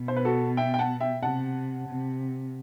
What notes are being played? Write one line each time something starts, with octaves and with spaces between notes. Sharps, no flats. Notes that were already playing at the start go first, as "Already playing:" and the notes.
Already playing: B2
C5
B4
F#4 A4
E5 G5
G5
F#5 A5
E5 G5
C3 F#5 A5
C3